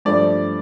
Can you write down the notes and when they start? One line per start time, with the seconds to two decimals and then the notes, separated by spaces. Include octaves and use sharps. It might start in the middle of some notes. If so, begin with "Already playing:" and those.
0.05 G2 F3 A3 D5